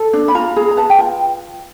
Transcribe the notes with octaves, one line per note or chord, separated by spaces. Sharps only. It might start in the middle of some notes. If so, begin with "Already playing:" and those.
Already playing: A4
D4
B5
F4 A#5
G#4 A#5
A#5
B4 A5
G5
F4